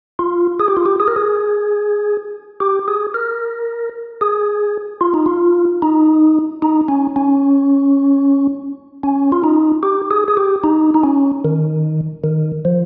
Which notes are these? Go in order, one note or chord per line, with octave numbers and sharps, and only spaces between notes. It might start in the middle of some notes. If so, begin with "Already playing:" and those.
F4
G#4
G4
F4
G4
G#4
A#4
G#4
G4
G#4
A#4
G#4
F4
D#4
F4
D#4
D#4
C#4
C#4
C#4
F4
D#4
G4
G#4
G#4
G4
D#4
D#4
C#4
D#3
D#3
F3